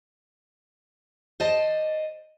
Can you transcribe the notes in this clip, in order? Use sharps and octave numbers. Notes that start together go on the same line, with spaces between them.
C5 D5 D#5 A5